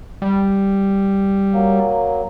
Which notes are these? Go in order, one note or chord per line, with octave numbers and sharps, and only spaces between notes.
G3
F#3 A#3